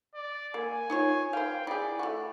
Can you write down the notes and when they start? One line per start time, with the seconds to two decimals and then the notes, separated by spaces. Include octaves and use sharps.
0.15 D5
0.54 A#3 G#5
0.90 D#4 F4 C#5
1.33 C5 F5 G5
1.67 E4 G#4 D5
1.99 A3 F#4